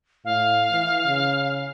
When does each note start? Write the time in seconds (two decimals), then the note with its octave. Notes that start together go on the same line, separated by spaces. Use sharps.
0.25 A2 F5
0.71 E3
1.05 C#3